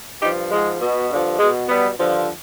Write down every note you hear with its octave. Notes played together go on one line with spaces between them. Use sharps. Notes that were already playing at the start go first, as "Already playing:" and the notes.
G2 F3 D#4 G4
G#2 F3 G#3
B2
G2 D3 F3
B2 G#3
B2 G3 B3
G2 D3 F3